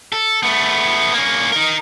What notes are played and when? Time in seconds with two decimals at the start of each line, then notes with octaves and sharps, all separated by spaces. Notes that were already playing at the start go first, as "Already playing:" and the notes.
0.12 A4
0.43 A3 B3
1.14 A#3 C#4
1.52 D#4 A#4